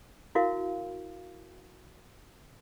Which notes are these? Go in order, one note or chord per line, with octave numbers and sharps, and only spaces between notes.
E4 F#4 A#4 F5